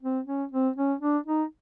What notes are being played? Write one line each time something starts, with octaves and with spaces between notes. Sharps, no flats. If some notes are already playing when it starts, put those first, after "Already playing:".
C4
C#4
C4
C#4
D4
D#4